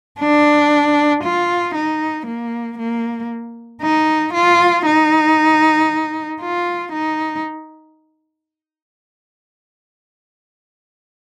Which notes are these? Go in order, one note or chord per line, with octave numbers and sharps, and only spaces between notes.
D4
F4
D#4
A#3
A#3
D#4
F4
D#4
F4
D#4